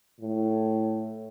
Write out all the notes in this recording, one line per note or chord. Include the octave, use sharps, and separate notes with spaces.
A2